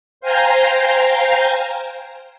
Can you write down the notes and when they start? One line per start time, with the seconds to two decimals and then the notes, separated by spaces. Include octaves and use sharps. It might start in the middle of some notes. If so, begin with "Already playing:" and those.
0.21 C5 F5 G5 G#5 A#5 C6